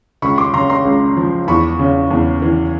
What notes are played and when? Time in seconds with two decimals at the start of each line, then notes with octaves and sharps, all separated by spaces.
0.22 C#2 B5 C#6
0.38 C6 D6
0.54 C#3 A#5 C6
0.70 A#5 C6
0.85 C#2
1.17 F3
1.48 E2 B5 C#6
1.79 C#3
2.10 E2
2.42 E3